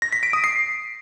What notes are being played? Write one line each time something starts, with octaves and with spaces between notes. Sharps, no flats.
A#6
B6
D7
D#6
C7